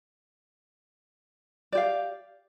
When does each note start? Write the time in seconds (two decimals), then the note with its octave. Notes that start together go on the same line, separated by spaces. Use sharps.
1.72 D5
1.75 G4
1.77 F5